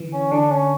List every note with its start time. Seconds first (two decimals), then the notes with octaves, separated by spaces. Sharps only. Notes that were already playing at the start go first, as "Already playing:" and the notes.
Already playing: D3 E3
0.13 C#4
0.31 D3 D4
0.51 C#4